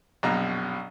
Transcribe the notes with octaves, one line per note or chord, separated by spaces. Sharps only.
A#1 F#2 B2 A#5